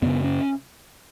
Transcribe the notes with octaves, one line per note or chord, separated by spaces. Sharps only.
F#2 C#3 B3
C#4